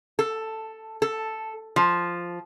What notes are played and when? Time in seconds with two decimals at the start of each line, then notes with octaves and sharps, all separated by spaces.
0.19 A4
1.02 A4
1.76 F3